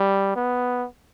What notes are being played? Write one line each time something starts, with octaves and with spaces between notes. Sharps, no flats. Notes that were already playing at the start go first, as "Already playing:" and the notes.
Already playing: G3
B3